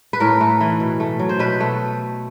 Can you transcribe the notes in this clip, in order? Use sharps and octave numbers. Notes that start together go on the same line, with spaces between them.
B4
A2 A#4
A3
E3
B2
A3
F#3
C5
B2 B4
A3